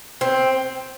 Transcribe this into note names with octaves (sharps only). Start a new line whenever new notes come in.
C4